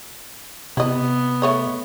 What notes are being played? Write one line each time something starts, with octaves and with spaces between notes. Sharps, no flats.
C3 B3 E4 D#5
A3 C#5 D#5